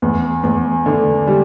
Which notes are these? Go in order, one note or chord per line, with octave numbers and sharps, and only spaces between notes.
E2
E2
D3
G3